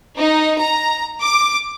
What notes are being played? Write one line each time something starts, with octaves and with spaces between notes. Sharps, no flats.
D#4
A#5
D6